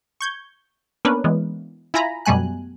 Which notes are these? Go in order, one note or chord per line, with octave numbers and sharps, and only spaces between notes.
C#6 G6 G#6
A#3 B3 C#4 D4 A#4 B4
E3 G#3 B3
E4 F4 G#5 A#5 B5
F#2 B2 G3 A3 G#5 F#6